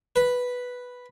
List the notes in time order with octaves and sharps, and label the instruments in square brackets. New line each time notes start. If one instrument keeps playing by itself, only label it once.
[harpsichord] B4